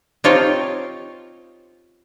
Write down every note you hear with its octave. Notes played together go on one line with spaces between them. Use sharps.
C4 D#4 F4 G4 C5 C#5